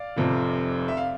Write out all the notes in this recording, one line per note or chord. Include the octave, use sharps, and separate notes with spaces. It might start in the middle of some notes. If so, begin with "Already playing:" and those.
Already playing: D5 F5
F1 F2 C3
E5
F5